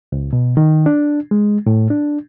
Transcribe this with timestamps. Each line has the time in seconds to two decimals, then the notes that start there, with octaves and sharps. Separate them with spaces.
0.12 C#2
0.33 B2
0.57 D#3
0.86 D4
1.31 G#3
1.66 A2
1.90 D4